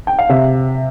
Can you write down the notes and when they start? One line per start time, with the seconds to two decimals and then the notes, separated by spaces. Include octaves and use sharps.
0.07 G5
0.19 F5
0.29 C3 E5